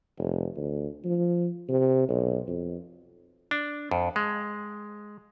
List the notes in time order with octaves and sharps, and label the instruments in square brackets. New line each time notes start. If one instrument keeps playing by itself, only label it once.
[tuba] F1
D2
F3
C3
B1
F2
[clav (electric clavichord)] D4
F2
G#3